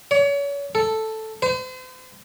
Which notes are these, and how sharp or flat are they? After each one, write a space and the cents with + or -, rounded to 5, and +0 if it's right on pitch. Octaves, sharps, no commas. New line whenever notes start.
C#5 +35
A4 +0
C5 -40